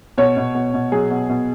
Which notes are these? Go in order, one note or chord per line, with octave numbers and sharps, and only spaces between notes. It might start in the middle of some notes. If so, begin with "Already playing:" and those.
B2 C#5
B2
B2
B2
F#3 G#4
B2
B2